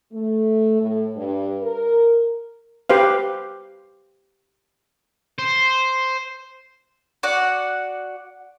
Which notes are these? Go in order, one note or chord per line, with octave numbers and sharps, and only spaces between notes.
A3
A2
G2
A#4
G4 B4 C5 F5
C5
F#4 D5 F#5